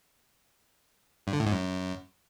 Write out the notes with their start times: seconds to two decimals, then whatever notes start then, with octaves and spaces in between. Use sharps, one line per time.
1.27 G2
1.33 D3
1.40 A2
1.46 G#2
1.52 F#2